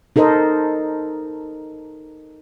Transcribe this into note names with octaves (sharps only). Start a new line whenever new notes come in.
D#4 A4 A#4 C5 D#5